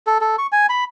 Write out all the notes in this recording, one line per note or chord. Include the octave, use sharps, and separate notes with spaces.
A4
A4
C#6
G#5
B5